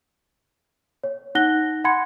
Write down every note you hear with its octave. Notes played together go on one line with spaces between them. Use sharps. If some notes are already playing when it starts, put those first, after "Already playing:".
C#5
D#4 F#5 F#6 A#6 G7
F#5 G#5 B5 C6 G#6 C#7